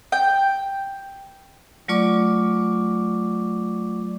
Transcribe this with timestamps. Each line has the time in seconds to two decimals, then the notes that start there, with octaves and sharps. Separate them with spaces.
0.12 G5
1.88 F#3 A3 F4 D5 C#6 D6